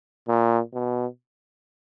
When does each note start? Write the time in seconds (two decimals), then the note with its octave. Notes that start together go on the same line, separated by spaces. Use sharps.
0.28 A#2
0.74 B2